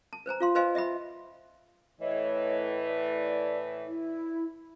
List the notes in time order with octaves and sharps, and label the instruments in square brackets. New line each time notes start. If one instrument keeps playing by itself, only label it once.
[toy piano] A5
B4 C5 G#5 A#5
F4 F5 C6
B4 C5 D#5 F5 G#5 C6
D#5 E5 G5 B5
[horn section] A2 E3 [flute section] C#5 D#5
[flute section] D5
E4